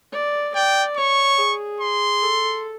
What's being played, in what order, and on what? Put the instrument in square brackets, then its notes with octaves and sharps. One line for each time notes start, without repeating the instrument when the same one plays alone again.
[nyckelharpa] D5
[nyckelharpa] D5 [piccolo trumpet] G5
[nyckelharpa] C#5 [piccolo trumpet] C#6
[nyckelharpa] G#4
[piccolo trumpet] C6
[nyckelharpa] A4